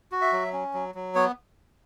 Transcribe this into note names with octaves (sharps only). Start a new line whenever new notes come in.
F#4
E5
F#3
C#4
F#3
F#3
B3 C#5